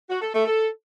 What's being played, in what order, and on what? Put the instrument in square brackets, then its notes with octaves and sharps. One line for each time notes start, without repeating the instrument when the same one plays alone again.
[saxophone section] F#4
A4
A3
A4